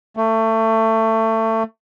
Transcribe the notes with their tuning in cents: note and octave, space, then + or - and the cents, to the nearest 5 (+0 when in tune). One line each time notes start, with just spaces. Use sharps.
A3 +25